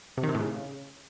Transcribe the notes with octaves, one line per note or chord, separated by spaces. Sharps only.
C3
D#3
C3
A2
C#3